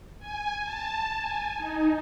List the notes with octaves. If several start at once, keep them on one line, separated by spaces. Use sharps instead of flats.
G#5
A5
G#5
D#4